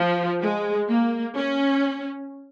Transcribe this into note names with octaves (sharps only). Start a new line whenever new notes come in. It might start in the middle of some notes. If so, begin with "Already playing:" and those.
Already playing: F3
G#3
A#3
C#4